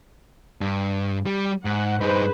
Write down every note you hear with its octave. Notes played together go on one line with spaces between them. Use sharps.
G2
G3
G#2 F#5
G2 D#4 G#4 B4 C5